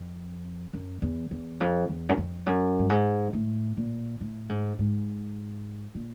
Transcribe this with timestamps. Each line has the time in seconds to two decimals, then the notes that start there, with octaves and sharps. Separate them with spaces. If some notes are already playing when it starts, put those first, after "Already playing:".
Already playing: F2
0.73 F#2
1.02 E2
1.31 E2
1.60 F2
1.89 E2
2.09 F#2
2.18 F2
2.46 F#2
2.79 G2
2.90 G#2
3.33 A2
3.77 A#2
4.21 A2
4.49 G#2
4.79 G#2
5.95 A#2